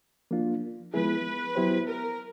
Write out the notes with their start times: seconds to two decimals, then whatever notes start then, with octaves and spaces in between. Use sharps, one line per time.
0.31 F3 A#3 D4 F4
0.94 F3 G#3 B3 E4 G#4 B4
1.55 F#3 B3 E4 G4 C5
1.87 A#4